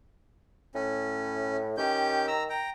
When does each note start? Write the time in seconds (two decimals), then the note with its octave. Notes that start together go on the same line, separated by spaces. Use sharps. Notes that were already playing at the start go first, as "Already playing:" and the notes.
0.75 A2 C#4
1.77 D#3 C#4 G4 G6
2.27 A#5 E6
2.50 G5 A#5